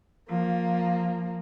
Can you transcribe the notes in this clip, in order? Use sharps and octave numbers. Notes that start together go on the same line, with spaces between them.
F3 A#3